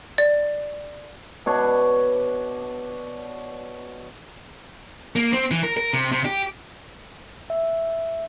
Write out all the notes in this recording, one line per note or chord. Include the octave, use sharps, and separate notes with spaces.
D5
B2 D4 C#5 D5
A#3
C4
E3
A#4
A#4
C3
C3
G4
E5